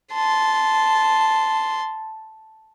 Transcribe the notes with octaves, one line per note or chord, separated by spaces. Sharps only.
A5 C6